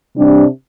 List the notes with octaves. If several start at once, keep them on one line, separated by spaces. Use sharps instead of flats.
C3 G3 D4